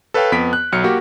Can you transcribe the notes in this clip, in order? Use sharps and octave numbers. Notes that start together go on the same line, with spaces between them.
A4 B4 C#5 F5 G5
F2 B3 B6 D7
F#6
B1 F#3 F6 C#7
A#3 F#4 G4